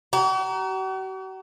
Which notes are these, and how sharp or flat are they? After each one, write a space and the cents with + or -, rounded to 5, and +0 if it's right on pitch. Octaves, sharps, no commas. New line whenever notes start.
F#4 +45 A#5 +0